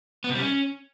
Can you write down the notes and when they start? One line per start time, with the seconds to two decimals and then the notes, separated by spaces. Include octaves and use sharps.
0.24 B3
0.30 C3
0.35 G3
0.40 C#4